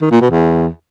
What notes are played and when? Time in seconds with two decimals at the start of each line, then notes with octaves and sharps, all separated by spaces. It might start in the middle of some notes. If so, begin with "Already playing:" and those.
0.02 D#3
0.11 A#2
0.21 B2
0.30 E2